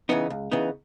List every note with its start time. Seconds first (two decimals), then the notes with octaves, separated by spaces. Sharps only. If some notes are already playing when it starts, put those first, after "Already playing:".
0.09 C#3 E3 B3 D#4
0.30 C#2
0.51 C#3 E3 B3 D#4